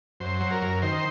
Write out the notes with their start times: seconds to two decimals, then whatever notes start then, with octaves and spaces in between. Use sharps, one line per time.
0.20 F#2 C5
0.40 F#3
0.51 A#4
0.61 F#2
0.82 D#3 C5